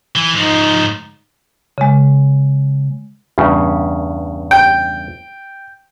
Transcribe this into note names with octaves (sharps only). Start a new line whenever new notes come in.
E3
G#2 F3 D#4
C#3 G#3
E2 G2 C#3
G5